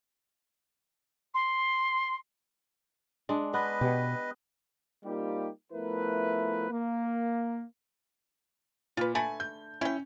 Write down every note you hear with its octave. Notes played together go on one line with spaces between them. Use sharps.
C6
G#3 D4
B3 B4 D#5
B2 G4
G3 A#3 C4 D#4 F4 G4
F3 A3 B3 E4 A#4 B4
A#3
A#2 F4 B4
D3 A3 G#5 B5
G6
C#4 E4 G5